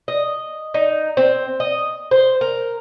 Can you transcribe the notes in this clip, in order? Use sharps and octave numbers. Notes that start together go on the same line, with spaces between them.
D#5
D#4
C4
D#5
C5
A#4